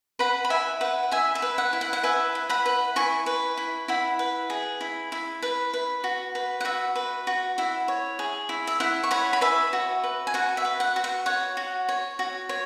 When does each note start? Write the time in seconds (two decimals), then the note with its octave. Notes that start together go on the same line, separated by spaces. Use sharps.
0.19 B4 F#5 B5
0.45 B5
0.50 E4 E5 G#5
0.81 B4 F#5
1.11 E4 E5 G#5
1.35 E5
1.42 B4
1.58 F#5
1.73 E4
1.81 F#5
1.93 F#5
2.03 B4 E5 G#5
2.35 E4
2.49 F#5 B5
2.66 B4
2.96 E4 G#5 C#6
3.26 B4
3.57 E4
3.88 E4 F#5 B5
4.19 B4
4.50 G#4
4.81 E4
5.12 E4
5.42 B4
5.74 B4
6.04 F#4
6.35 B4
6.60 F#5
6.65 F#4 E5
6.95 B4
7.27 F#4
7.58 E4 F#5
7.88 C#5
8.19 G#4
8.49 E4
8.67 E5
8.80 E4 F#5
9.03 C#6
9.11 C#5 F#5 B5
9.33 B5
9.41 B4 E5 G#5
9.73 F#4
10.04 B4
10.27 G#5
10.34 F#4 F#5
10.57 E5
10.65 B4
10.80 F#5
10.96 F#4
11.04 F#5
11.26 C#5 F#5
11.57 F#4
11.89 C#5
12.19 F#4
12.49 C#5